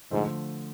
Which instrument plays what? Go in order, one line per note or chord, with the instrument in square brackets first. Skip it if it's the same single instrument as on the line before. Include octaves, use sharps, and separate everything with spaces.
[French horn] G#2 [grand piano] D3 F3 A3